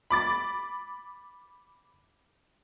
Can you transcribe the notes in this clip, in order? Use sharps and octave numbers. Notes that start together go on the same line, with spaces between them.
B5 D6 A6